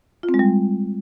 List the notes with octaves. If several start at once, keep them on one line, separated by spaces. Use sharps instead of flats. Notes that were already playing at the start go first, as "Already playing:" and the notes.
F4
C4
G#3
G3